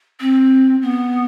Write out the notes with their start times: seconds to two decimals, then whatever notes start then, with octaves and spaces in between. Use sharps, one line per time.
0.20 C4
0.82 B3